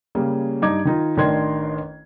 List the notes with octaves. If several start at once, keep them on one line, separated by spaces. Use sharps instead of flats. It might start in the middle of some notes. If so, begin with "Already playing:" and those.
C#3 G3 A#3 G#4
G2 D4 D#4 D5 D6 G#6
D#3 D#4 F4
A1 D#3 D4 A#4 C6 G#6